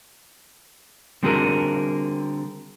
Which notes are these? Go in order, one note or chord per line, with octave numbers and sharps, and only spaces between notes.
D3 G3 C4 F#4 G#4 A#4